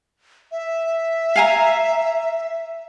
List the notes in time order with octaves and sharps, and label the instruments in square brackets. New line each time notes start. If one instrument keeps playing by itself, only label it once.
[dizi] E5
[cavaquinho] F5 G#5 A#5